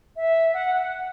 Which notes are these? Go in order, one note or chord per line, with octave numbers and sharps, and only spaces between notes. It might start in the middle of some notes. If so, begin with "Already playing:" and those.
E5
F#5
F#5